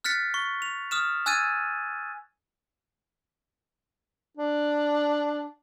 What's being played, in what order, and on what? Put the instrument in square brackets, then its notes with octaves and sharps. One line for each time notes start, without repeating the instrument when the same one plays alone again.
[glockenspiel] F6 F#6 A6 B6 C#7
C#6
F7
D#6 F6 E7
G#5 E6 F#6 G#6 A6 D#7
[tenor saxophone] D4